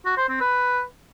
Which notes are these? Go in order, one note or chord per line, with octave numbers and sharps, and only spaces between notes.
F#4
C5
C4
B4